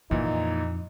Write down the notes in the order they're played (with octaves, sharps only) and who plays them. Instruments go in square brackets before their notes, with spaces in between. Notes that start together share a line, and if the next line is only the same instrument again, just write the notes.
[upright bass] F2 [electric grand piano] A#2 E3 [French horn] D#4